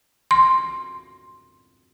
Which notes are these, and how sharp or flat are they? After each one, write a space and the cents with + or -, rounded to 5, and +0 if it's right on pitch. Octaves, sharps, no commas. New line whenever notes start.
C6 +5